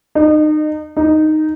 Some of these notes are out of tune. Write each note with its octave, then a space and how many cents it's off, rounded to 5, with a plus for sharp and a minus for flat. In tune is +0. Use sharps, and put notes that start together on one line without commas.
D#4 -30
D#4 -5